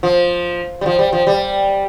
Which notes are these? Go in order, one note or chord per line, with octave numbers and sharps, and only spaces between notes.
F3
G3
F3
G3
F3
G3